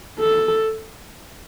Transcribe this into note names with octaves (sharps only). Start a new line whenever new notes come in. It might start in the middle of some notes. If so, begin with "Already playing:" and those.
A4